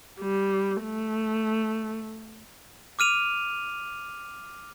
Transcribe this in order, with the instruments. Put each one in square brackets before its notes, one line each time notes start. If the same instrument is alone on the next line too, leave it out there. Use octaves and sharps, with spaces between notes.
[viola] G3
A3
[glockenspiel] D6 F6 D#7 F7